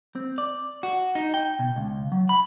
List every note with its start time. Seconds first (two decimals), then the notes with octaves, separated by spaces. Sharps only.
0.15 C4
0.38 D5
0.83 F#4
1.15 D#4
1.34 G5
1.59 B2
1.76 C#2
2.12 F#3
2.29 B5